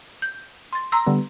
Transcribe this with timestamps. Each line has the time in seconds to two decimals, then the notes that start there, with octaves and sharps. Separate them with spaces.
0.22 G6
0.73 C6 A6
0.92 A#5 C6 E6 A#6
1.06 D3 G3 B3